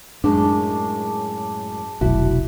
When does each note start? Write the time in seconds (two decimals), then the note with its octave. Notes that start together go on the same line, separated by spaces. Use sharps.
0.24 F#2 A2 G#3 D4 A5 D6
2.01 F1 B1 E4 F#4